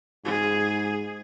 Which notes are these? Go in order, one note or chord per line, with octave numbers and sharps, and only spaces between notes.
G#2 G#4